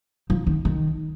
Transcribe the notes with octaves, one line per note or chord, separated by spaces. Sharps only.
F3
D#3
D#3